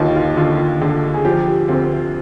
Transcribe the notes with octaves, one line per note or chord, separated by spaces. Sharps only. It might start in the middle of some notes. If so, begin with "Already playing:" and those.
Already playing: D#2 D3 D#4 F4
F4
D3 F4
D3
G#4
F3 G4
D2 C4